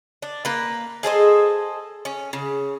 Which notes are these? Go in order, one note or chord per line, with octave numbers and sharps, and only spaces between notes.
D4
A#3 B4
G#4 A4 C5 D#5
C#4
C#3